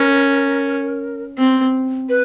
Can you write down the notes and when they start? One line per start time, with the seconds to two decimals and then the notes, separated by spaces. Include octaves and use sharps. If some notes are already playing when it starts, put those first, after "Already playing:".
Already playing: C#4 A#4
1.38 C4
2.09 B4